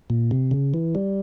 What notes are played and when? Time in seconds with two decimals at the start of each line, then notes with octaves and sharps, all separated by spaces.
0.10 A#2
0.31 C3
0.51 C#3
0.74 E3
0.95 G3